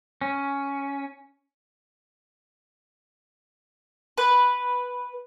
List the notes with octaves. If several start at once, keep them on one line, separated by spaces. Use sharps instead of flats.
C#4
B4